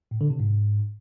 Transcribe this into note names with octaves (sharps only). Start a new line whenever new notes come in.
A2
D3
C3
G#2